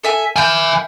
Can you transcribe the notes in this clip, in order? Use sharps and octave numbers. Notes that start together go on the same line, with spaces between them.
A4 E5 G#5
E5 G#5 F6 G6